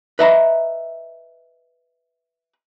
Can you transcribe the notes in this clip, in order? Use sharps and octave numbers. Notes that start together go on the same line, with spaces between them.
B4 D#5 E5 A#5 B5